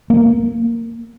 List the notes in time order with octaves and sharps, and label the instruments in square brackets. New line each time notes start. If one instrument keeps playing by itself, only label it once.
[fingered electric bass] A#3